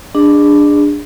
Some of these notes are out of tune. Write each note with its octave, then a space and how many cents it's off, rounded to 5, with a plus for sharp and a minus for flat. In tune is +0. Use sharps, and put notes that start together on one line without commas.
D4 +0 G#4 -25 D#5 -45